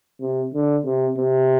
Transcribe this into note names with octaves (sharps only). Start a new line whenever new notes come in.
C3
D3
C3
C3